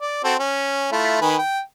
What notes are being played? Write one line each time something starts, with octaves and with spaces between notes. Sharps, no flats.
D5
C4 F#4 A4
C#4
A3 E4 F4
D#3 B4 G#5
G5